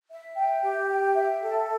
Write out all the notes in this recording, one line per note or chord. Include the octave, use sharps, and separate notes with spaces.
E5
G5
G4
G5
E5
A4